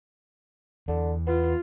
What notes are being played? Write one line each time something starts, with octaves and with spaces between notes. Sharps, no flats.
E2 D3
B3 F4